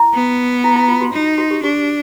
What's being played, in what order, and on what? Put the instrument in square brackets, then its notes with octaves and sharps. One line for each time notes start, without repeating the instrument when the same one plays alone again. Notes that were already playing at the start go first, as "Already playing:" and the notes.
Already playing: [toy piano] E4
[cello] B3
[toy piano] E4
E4
F4
F#4
[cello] D#4
[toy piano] F#4
G4
[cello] D4 [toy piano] G4